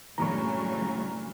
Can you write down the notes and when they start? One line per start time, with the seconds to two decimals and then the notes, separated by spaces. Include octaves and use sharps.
0.18 G2 A#2 C#3 E3 F#3 A3 A#5 C#6